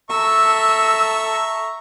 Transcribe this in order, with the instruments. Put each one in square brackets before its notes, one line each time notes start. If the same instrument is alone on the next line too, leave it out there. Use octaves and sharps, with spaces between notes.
[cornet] A4 [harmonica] E5 A#5 C#6 [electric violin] E6